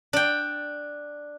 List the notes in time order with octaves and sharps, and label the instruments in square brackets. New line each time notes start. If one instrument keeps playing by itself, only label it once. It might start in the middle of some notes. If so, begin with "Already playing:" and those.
[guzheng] D4 G5